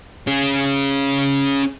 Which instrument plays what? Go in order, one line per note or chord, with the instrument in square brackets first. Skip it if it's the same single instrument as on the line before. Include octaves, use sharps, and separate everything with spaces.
[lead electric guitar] C#4 G#4